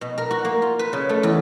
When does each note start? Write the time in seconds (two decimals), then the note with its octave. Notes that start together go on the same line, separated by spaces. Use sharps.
0.01 B2
0.18 A#4
0.31 F#4
0.45 A#3
0.62 F4
0.79 B4
0.93 C#3
1.09 A3
1.23 E2